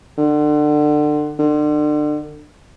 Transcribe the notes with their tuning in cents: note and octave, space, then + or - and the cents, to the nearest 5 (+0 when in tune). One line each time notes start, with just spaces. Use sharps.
D3 +30
D3 +35